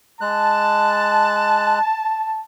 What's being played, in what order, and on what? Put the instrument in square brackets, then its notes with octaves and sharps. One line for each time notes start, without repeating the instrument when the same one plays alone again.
[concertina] G#3 F#6 [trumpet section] A5